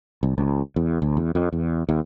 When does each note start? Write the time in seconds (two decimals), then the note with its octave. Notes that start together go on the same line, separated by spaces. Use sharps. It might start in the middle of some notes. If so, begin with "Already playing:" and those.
0.23 C2
0.38 C#2
0.76 E2
1.02 D2
1.17 E2
1.35 F2
1.53 E2
1.89 D#2